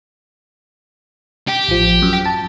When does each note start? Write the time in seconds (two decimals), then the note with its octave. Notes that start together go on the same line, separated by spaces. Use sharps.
1.48 G4
1.68 A1 F3
2.02 F#2
2.26 A5